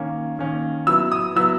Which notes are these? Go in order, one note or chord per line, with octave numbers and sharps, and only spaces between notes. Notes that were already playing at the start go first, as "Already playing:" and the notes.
Already playing: D#3 A#3 C#4
D#3 A#3 C#4
F#3 B3 E4 E6
D#6
F#3 B3 E4 E6